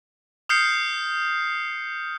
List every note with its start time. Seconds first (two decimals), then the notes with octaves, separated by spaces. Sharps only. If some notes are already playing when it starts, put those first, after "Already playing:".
0.49 D#6 F6 G6 C7 C#7